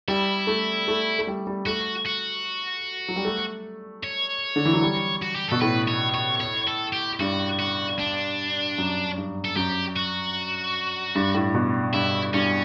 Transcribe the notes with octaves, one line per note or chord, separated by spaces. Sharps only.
G3 E4
A3
A3
A3
G3
G3
A3 F#4
F#4
F#3
G3
A3
C#5
D3
E3
F#3
G3
F#4
G4
B2 A4
A2 B4
C#5
C#5
C#5
A4
G4
G2 F#4
F#4
D4
F#2
G2
A4
F#2 G4
F#4
G2
A2
B2
G2 E4
G2 C#4